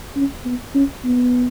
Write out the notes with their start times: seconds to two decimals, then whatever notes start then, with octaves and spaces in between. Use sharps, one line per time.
0.16 C#4
0.45 B3
0.75 C#4
1.04 B3